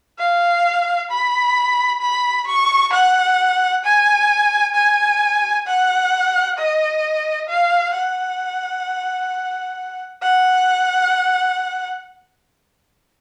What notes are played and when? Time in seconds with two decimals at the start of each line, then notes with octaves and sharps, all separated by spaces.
0.19 F5
1.10 B5
2.01 B5
2.47 C#6
2.93 F#5
3.84 G#5
4.75 G#5
5.67 F#5
6.58 D#5
7.49 F5
7.94 F#5
10.22 F#5